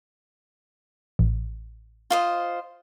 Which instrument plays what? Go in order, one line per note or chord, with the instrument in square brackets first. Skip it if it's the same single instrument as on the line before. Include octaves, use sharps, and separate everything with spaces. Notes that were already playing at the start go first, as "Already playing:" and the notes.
[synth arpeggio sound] A1
[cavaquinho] F4 C5 D#5